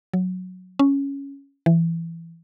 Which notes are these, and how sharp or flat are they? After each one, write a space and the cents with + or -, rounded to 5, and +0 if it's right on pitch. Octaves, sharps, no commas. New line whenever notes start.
F#3 -10
C#4 +5
E3 +15